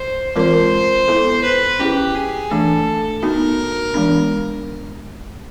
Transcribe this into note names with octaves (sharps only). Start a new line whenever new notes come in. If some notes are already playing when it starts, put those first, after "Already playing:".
Already playing: C5
E3 G#3 C4 F4 A#4 C5
B3 E4 A4
B4
C#4 E4 G4 G#4
G#4
E3 A3 D4 A4
B3 D#4 F#4 A#4
E3 G#3 B3 D4